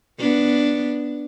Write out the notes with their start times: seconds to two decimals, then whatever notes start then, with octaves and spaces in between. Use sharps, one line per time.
0.18 B3 D4